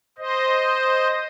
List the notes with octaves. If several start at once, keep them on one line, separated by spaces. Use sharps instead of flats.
C5 D#5